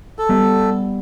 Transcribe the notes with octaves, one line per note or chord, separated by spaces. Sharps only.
A4
G3 B3